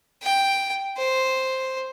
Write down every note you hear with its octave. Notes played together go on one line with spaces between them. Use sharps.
G5
C5